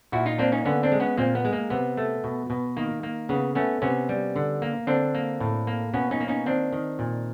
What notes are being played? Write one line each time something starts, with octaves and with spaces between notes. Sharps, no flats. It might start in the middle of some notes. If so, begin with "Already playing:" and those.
A#2 E4 F#4
D#4 F4
A#3 C4 D4
C#4 D#4
D3 B3 C#4
C4 D4
G#3
B3 C#4
A#2 A#3 C4
B3
G#3
A#3
C3 B3
A3
B2
B2
D#3 A#3
A#3
C#3 B3
A3 B3 C#4
C3 B3 C#4
G3
D3
A#3
D3 C4 D4
A#3
A2
A#3
B2 B3 C#4
C#4 D#4
A#3
C#4 D#4
D#3 C4 D4
D#3
A#2